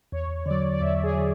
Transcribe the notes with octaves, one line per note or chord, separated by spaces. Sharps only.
E2 C#5
D3 F#3 D5
D5
E2 E5
G#4
D3 F#3